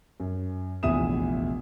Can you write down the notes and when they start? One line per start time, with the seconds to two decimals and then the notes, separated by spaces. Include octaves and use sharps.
0.20 F#2
0.83 F1 A#1 E2 E5 D#6 E7